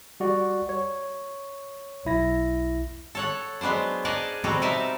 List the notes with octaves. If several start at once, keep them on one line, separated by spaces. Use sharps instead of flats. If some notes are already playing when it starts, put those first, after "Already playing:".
G3 F#4 D5
C#5
B1 E4 A#6
A4 C#5 F#5
F#3 G#3 B3 D4 C5
G#4 A#4 D5 D#5 F#5 A5
B2 G3 C4 F#4 A4 A#5
D#4 A#4 E5 A5